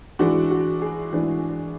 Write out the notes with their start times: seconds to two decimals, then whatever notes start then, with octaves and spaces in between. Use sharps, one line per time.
0.19 E3 G#3 D4 F#4
0.51 F#4
0.82 G#4
1.13 E3 G#3 D4